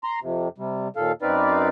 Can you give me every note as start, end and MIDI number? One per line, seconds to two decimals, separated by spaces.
0.04 0.19 82
0.04 0.19 84
0.22 0.48 41
0.22 0.48 48
0.58 0.88 48
0.58 0.88 55
0.96 1.12 39
0.96 1.12 46
0.96 1.12 69
0.96 1.12 77
1.22 1.69 42
1.22 1.69 60
1.22 1.69 63
1.22 1.69 71
1.22 1.69 74
1.22 1.69 77